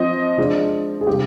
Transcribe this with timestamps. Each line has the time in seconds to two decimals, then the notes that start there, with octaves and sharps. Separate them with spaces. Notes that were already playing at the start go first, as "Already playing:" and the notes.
Already playing: F3 C4 D#5
0.38 F3 G#3 D4
1.01 G#4
1.07 C3 G3 D4 G4